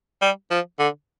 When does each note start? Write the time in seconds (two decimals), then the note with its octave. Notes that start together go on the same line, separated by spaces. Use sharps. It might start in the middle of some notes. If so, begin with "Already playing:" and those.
0.22 G3
0.51 F3
0.79 D3